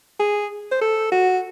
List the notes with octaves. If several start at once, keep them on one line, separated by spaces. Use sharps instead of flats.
G#4
C5
A4
F#4